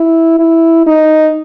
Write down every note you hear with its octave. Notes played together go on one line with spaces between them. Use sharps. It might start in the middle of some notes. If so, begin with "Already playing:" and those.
Already playing: E4
E4
D#4